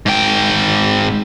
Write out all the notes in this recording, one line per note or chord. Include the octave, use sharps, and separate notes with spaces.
G#2 G5